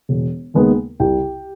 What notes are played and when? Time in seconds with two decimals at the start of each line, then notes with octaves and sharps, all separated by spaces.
0.09 E1
0.54 D#2 D#3 G#3 B3
1.00 C2 G4 G5